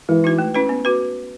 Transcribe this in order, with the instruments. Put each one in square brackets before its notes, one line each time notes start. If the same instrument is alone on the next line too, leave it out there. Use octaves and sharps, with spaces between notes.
[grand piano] E3 [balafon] G#3
[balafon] D#4 F#4 B4
A3
C#4 E4 B4
B3
F#4 B4